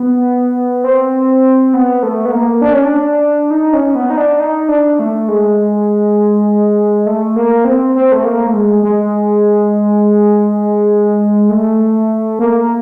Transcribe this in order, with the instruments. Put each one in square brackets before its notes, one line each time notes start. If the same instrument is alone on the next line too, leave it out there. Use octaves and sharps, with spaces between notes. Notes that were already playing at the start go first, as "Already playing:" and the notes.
Already playing: [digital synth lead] B3
C4
B3
A3
B3
A#3
D4
C#4
D4
D#4
C#4
B3
D#4
D4
D#4
D4
A3
G#3
A3
A#3
C4
C4
A3
A#3
A3
G#3
G#3
A3
A#3